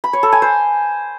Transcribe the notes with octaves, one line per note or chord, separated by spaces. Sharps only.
B5
C#5
A4
G#5
C5